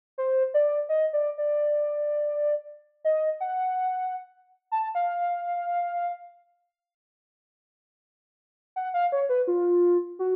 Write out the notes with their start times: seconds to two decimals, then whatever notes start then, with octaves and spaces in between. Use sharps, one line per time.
0.18 C5
0.54 D5
0.89 D#5
1.13 D5
1.38 D5
3.05 D#5
3.40 F#5
4.72 A5
4.95 F5
8.76 F#5
8.94 F5
9.12 C#5
9.29 B4
9.47 F4
10.19 F#4